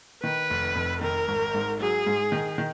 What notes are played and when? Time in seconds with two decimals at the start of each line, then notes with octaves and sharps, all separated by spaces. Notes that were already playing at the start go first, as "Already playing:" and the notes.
0.23 D#3 B4
0.50 F1
0.75 F2
1.01 D#3 A#4
1.28 G#1
1.54 G#2
1.80 F#3 G#4
2.06 G#2
2.32 D#3
2.58 D#3